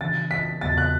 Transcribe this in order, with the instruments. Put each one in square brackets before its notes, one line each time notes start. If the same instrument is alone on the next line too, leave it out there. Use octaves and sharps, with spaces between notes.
[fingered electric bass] C#3 E3 B3 D4 [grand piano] A6
[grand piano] B6
[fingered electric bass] E2 C#3 F#3 B3 [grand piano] A6
[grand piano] F#6